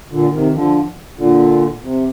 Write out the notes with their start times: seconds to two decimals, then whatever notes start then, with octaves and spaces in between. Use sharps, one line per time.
0.11 A#2 D3
0.33 C3 D#3
0.54 D3 F3
1.18 A#2 D3
1.82 C3